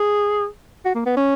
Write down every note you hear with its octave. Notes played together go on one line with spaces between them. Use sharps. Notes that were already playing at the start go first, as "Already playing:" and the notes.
Already playing: G#4
F#4
A#3
B3
C#4